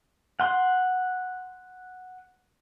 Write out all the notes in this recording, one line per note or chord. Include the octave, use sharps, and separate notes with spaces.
F#5 C6